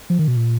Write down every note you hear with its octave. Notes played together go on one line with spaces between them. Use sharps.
F3
D#3
B2
A#2